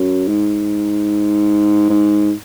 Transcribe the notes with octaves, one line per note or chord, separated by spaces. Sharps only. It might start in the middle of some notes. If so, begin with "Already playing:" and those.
Already playing: F#2
G#2
G#2